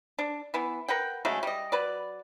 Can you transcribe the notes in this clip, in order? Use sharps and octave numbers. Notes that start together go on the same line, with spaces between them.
D4
E3 B3
A#4 B4 F#5 G5
C#3 F#3 G#3 A3
G3 D#5
F#3 B4 D5